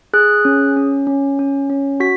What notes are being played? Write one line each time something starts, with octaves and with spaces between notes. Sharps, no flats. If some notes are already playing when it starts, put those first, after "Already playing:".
G#4 F#6
C#4
C#4
C#4
C#4
C#4
F#4 B6